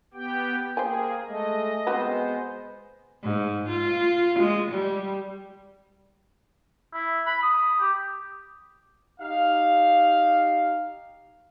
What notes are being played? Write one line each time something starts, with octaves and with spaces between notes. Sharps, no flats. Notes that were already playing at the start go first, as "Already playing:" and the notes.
B3 G4 G5
A#3 G#4 C5 G5 G#5
G#3 A3 D#5
G#3 B3 C4 F#4 B4 C5
G#2
F4
G#3
G3
E4
B5
D#6
G4
D#4 G4 F5